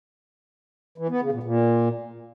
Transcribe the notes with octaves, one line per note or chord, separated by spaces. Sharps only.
E3
B3
C#3
A#2
A#2